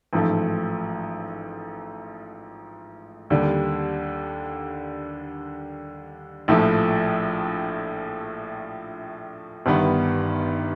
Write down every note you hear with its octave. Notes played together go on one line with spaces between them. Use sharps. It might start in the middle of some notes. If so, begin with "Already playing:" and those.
A1 G#2 F3 A3
D#2 D3 G3
A#1 A2 F3 A3
G1 G2 D#3 G3 B3